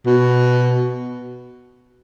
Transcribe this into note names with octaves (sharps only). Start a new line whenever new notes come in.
B2